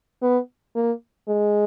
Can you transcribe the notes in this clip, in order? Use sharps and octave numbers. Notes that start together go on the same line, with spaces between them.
B3
A#3
G#3